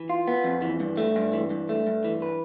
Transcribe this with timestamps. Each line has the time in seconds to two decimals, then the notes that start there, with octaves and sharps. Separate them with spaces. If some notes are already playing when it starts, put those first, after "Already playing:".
Already playing: E3
0.10 F4
0.28 B3
0.44 F2
0.62 E3
0.80 G2
0.97 A3
1.16 G2
1.33 E3
1.50 G2
1.69 A3
1.87 G2
2.05 E3
2.22 B4